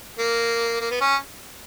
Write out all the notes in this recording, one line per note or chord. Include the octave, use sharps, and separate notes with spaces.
A#3
A#3
B3
C#4